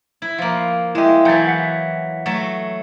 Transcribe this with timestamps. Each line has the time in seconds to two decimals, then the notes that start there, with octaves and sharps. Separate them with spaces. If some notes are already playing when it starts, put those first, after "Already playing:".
0.22 E4
0.38 F3 A#3
0.95 G#3 E4 G4 E5
1.25 E3 F#3 G#5 G6 A6
1.47 F#5 B6 C#7
2.26 F#3 A3 A4